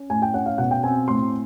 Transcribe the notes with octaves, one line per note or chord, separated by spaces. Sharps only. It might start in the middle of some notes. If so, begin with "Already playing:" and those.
Already playing: C#4
A2 G#5
G5
C#4 F#5
F5
B2 F#5
G5
C4 G#5
A2 C6